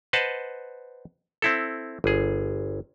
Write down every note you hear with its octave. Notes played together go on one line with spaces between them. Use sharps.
B4 C5 D#5 F#5 A5
C4 E4 A4
G1 G#4